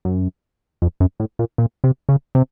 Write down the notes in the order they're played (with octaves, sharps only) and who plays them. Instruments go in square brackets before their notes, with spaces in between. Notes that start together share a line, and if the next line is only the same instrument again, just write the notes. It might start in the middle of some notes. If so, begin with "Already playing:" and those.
[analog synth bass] F#2
F2
F#2
A2
A#2
A#2
C3
C#3
C3